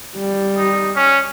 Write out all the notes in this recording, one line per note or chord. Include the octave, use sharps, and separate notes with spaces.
G3
D#4
C#4